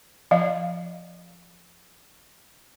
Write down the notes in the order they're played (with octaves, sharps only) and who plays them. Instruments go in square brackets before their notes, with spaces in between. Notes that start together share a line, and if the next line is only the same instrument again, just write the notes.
[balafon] F3 D#5 F5